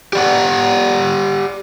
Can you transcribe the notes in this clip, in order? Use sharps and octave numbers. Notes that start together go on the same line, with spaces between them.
G4 D5 F#5